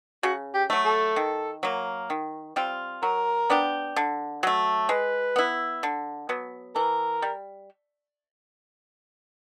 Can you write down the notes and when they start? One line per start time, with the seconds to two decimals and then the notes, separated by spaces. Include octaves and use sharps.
0.23 C#3 F#4
0.54 G4
0.70 F#3 A3
0.86 A4
1.16 D#3
1.63 F#3 A#3
2.10 D#3
2.56 G3 C4 F4
3.02 F#3 A#4
3.50 B3 D4 G4
3.96 D3
4.43 F#3 A3
4.89 G#3 B4
5.36 B3 E4
5.83 D3
6.29 F#3 B3
6.75 E3 A#4
7.22 G3